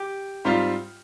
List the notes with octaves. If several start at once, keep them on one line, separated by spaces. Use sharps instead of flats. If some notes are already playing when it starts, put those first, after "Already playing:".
Already playing: G4
G#2 G3 C4 F4